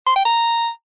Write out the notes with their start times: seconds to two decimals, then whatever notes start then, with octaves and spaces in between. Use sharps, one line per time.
0.06 C6
0.16 G5
0.25 A#5